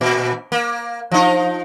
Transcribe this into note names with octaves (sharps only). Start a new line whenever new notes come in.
A#2
A#3
F3 D#4